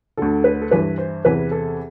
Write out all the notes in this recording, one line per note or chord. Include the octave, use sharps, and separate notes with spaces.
D2 D3 A4
B4
A4
G2 E3 B4
C5
E2 C3 E3 B4
A4